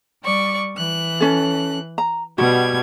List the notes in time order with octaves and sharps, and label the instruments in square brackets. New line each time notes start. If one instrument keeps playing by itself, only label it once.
[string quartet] G3 D5 C#6
E3 F#6
[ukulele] C#4 A4
A#5
[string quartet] B2 G3 G#6 [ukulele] F#4